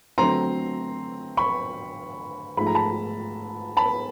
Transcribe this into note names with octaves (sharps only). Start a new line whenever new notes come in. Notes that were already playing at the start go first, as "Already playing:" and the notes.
D3 F#3 A3 C4 A#5 C6
B5 C#6
G#2 F3 A3 B5
A#5
A5 B5
A5 B5